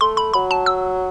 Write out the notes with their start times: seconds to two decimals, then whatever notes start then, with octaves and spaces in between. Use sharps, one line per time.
0.01 A3 C6
0.17 B5
0.34 F#3 B5
0.51 A5
0.66 E6